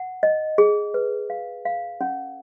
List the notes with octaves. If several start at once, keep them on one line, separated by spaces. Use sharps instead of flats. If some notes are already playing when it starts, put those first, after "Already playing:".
Already playing: F#5
D#5
G#4
B4
F5
F5
C#4